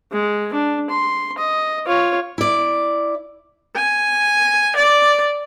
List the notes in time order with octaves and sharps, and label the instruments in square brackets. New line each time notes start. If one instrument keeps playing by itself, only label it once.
[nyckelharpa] G#3
D4
C6
D#5
F4 C#5
[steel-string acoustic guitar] E4 D5
[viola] G#5
D5